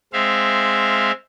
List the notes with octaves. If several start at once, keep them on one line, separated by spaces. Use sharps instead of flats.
G#3 C4 E5 F5